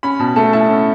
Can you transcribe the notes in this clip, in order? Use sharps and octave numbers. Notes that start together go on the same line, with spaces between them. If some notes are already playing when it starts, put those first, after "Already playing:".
C#4 B5
B2 A5
A3 A5
E4 A5
C#4